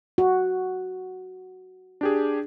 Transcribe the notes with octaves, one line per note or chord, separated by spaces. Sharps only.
F#4
D4 G4 G#4